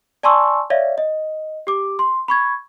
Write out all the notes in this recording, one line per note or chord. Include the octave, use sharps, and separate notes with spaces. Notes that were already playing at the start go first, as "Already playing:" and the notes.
D5 G#5 A5 C6 C#6 E6
C#5 D5 E5 F5
D#5
G4 D6
C6
B5 C#6 G#6